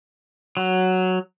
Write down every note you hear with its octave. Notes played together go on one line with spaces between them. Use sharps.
F#3